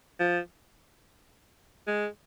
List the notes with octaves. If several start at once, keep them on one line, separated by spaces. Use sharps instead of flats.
F3
G#3